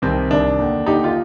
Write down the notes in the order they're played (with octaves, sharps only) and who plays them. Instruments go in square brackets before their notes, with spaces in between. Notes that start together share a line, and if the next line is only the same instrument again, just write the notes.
[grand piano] C2 C3 D#3 C4
C2 C3 D#3 D4
D#2 D3
D#2 D3 D#4 G4
F4